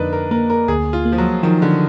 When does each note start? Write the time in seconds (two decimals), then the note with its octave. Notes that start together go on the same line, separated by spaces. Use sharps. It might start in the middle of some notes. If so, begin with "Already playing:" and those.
Already playing: F2 D3 A#3 D4 D#4 B4
0.13 A#4
0.31 A#3 A#4
0.50 A#4
0.68 D2 G#4
0.93 F4
1.05 A#3
1.12 F3
1.18 F#3
1.43 D#3 F3
1.62 D3